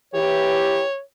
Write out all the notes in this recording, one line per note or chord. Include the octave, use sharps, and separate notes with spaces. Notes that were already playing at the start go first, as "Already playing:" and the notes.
E3 G4 C#5